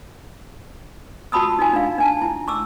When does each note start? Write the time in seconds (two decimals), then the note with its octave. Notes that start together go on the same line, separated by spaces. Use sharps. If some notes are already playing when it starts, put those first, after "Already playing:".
1.32 F4 F#4 A5 B5 D#6 E6
1.59 D#4 F4 G#5
1.73 D4 F5
1.98 D4 G#5 A5
2.22 E4
2.48 C#6 D6 E6